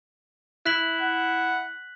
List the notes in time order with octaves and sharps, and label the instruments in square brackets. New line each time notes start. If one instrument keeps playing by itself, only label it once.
[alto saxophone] E4 [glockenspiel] F#6 B6 F#7
[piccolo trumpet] F#5